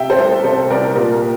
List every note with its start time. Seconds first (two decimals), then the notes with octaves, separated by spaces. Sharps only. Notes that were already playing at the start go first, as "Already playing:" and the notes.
Already playing: C3 E5 G5
0.10 A4 C5
0.18 C2
0.27 A4
0.44 C3 A4 C5
0.70 C2 A#4 D5
0.95 A#2 G4 A#4